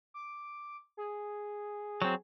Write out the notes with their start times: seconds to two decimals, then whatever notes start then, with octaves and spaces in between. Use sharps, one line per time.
0.14 D6
0.97 G#4
2.02 F#3 C4